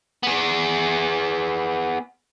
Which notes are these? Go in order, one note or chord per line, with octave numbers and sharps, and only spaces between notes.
B3 G#4